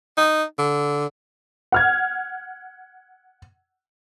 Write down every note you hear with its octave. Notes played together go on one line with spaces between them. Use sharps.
D#4
D3
F#5 F6 G#6